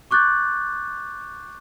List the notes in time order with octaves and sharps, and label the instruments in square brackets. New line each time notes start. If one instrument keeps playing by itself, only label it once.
[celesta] C#6 D6 F#6 G6 A6